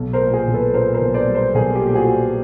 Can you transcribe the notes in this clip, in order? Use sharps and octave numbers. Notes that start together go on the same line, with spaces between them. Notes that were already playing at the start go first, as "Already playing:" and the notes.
Already playing: B1
A#4 C5
A#2
G#4 A#4
B1
A4 B4
A#2 A#4 C5
A#4 C5
B1
C5 D5
G3
A#4 C5
B1 G#4 A#4
G4 A4
A#2
G4
F#4 G#4